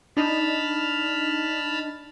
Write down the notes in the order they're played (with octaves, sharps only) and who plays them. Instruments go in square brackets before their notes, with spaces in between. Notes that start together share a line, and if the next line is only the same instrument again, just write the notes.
[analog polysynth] D4 D#4 D#5 [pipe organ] A5 B5 F6